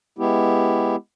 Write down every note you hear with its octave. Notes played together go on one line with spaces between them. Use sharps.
G#3 B3 E4 G4